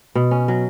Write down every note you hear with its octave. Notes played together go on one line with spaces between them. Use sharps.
B2
C#4
F#3